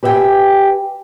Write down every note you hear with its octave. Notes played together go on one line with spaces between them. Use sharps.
G4 B4 E5 F5 G5 G#5